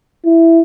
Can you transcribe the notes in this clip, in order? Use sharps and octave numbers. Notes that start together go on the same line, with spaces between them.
E4